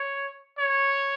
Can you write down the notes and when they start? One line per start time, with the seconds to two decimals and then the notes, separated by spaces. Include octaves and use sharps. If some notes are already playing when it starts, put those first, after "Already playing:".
Already playing: C#5
0.59 C#5